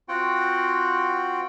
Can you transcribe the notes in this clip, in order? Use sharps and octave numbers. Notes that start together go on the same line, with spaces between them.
C4 F4 F#4 F#5 G5